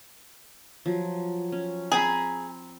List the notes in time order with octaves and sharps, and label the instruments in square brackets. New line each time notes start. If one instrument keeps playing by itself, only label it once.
[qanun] F3 F#3
C#4
[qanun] C4 A#5 B5 [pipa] G#4